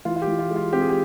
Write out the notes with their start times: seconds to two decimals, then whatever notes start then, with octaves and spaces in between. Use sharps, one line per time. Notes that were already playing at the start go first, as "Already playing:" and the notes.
0.05 E3 F4
0.16 F4
0.22 G4
0.27 E3
0.39 F4
0.50 G#3
0.56 F4
0.73 C4 G4
0.81 G#4
0.90 G4